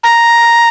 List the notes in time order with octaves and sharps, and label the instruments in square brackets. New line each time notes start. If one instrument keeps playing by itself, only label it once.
[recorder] A#5